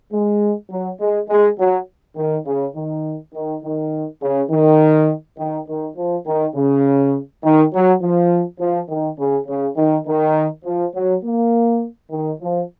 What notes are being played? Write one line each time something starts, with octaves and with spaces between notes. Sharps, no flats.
G#3
F#3
G#3
G#3
F#3
D#3
C#3
D#3
D#3
D#3
C#3
D#3
D#3
D#3
F3
D#3
C#3
D#3
F#3
F3
F3
D#3
C#3
C#3
D#3
D#3
F3
F#3
A#3
D#3
F3